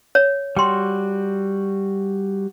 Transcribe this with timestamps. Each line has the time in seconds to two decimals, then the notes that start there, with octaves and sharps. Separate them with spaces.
0.15 C#5
0.57 G3 F#4 G5 C6